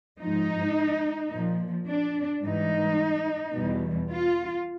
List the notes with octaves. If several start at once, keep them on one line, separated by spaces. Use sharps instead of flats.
G#2 F3 D#4
A#2 F3
D4
G#2 E3 G3 D#4
E2 B2 G3
F4